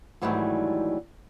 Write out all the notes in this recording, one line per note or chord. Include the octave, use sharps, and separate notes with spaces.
G#2 D#3 E3 F#3 G3 A3